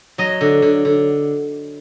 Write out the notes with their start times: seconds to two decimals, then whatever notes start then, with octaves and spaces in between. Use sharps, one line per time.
0.18 F#3 D#5
0.41 D3
0.62 D3
0.85 D3